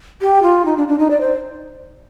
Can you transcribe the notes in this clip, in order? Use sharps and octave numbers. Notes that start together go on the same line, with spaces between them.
G4
F4
D#4
D4
D4
D#4
D5
C5